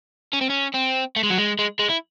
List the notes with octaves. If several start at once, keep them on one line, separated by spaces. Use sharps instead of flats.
C#4
C4
C#4
C4
A3
G#3
F#3
G#3
G#3
G#3
E4